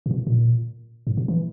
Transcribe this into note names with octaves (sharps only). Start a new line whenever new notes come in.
A#2
B2
A#2
G#2
B2
E3